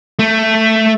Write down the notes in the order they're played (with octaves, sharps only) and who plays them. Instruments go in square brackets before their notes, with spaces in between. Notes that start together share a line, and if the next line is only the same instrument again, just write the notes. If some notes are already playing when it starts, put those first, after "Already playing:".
[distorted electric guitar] A3